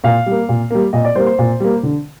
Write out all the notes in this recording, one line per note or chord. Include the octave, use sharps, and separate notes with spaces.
A#2 F5
G3
A#3
A#2
G3 A#3
A#2 D#5
D5
G3 A#3 C5
C5
A#2
G3 A#3
D3